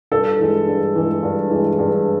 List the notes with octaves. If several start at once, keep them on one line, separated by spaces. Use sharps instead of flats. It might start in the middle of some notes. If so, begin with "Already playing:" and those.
G2 A4
E3 G#3
G2
E3 G#3
G2
E3 G#3
G2